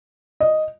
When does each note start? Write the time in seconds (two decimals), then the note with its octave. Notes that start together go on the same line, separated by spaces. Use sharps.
0.40 D#5